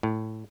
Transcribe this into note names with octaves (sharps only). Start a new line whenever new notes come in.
A2